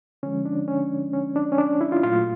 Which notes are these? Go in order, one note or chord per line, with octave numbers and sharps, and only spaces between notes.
D3 F3 G#3 C#4
D4
C#4
C#4
D4
C#4
D4
E4
F4
A#2 F#3 A3 F4